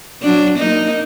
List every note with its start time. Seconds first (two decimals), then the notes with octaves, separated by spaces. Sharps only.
0.22 F#3 D4
0.59 A#3 D#4